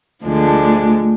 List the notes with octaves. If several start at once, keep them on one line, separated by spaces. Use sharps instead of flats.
D2 D3 F3 G#3 D4
A3